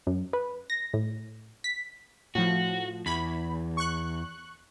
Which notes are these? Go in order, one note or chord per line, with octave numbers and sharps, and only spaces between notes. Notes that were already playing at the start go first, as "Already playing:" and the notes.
F#2
B4
A#6
A2
B6
A2 F3 F#4
E2 B5
C#6 F#6